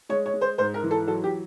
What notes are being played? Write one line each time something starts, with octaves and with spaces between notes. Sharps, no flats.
G#3 C#5
C#5
G#3
C5
G#2 C5
A#4
E3
A4
F#3 A4
G4